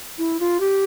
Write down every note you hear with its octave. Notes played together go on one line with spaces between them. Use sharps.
E4
F4
G4